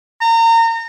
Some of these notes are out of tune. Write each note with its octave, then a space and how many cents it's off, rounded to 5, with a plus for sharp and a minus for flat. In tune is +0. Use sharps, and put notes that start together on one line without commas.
A#5 -30